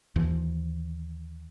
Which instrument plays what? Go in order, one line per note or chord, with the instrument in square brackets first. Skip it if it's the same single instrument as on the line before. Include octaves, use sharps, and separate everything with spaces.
[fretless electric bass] D#2 E3 F3